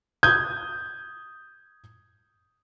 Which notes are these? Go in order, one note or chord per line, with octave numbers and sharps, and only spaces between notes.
D#6 G6 G#6